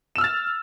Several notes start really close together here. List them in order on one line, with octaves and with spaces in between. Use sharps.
E7 E6 F6 A6